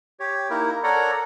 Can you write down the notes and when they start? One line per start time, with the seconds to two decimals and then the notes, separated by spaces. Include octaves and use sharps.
0.20 G4 C#5
0.50 A#3 D#4 E4 A#4
0.84 A4 A#4 C#5 D5 F#5 A#5